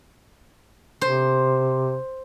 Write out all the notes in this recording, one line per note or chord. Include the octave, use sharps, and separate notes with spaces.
C3 C5